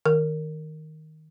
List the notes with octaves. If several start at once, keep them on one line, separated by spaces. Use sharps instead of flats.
D#3 A#4